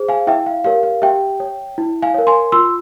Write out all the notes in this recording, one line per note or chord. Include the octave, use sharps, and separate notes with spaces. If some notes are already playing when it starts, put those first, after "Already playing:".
Already playing: G#4 C5
F5 G#5
E4 E5 G5
F5
G4 A#4 C#5 F5
F5
G4 E5 G5
C#5
E4
F5 G#5
A#4 C#5
G#5 C6
F4 C6 E6